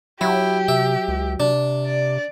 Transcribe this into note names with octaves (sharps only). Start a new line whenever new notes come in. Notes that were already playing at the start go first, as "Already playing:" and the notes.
F#3 E4 G4
C3 E5
C#2
C3 D4
D5